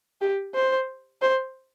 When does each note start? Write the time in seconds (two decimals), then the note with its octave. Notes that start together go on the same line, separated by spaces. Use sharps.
0.21 G4
0.55 C5
1.22 C5